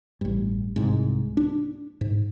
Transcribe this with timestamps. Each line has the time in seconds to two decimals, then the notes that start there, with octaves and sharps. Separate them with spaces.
0.21 A1 G2
0.76 C2 G#2
1.37 D4
2.01 G#2